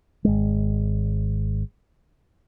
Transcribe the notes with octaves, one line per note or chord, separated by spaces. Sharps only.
G#1 G#3